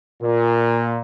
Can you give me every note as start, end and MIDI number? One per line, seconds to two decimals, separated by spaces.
0.22 1.01 46